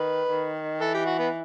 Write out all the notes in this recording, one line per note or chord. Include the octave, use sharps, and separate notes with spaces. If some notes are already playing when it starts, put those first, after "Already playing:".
Already playing: D#3 B4
D#3
E3 A4
G4
F#4
B3